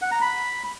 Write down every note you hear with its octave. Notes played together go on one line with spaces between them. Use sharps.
F#5
A#5
B5